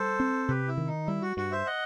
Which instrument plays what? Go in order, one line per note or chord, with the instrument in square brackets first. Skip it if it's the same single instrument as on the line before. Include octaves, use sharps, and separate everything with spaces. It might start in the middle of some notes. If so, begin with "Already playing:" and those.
Already playing: [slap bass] G3 [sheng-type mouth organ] A4 C5
[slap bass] C4
[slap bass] C3 [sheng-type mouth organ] G4 B4
[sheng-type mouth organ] E4
[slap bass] D#3
[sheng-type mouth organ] D#4
[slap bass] G3 [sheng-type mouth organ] E4
[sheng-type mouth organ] F#4
[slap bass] G2 [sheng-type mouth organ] F#4
[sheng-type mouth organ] C5 E5
D#5 F#5